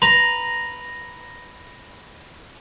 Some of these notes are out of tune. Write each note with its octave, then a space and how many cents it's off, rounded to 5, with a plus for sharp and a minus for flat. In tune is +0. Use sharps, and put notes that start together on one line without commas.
B4 +0 A#5 +0